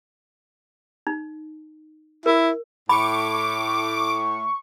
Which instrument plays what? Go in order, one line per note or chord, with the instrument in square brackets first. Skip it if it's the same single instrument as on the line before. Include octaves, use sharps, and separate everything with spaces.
[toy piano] D#4
[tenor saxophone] E4 [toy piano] A#4
[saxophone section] A2 [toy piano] B5 [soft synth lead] C#6 [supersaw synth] D6